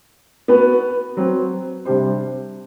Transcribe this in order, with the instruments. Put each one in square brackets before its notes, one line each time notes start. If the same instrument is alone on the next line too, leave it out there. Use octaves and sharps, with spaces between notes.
[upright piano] B3 F#4 B4
F#3 C4 F#4
C3 G3 D4 G4 C5